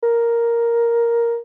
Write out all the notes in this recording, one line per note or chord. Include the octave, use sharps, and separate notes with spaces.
A#4